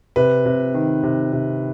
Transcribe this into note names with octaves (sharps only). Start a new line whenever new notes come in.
C3 B4
C3
D#3
C3
C3